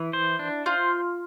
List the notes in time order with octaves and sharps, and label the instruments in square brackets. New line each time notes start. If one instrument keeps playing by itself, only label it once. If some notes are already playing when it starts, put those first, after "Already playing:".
Already playing: [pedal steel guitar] E3 [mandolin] E4
[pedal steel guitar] C5
D4
[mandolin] F4 [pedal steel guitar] C5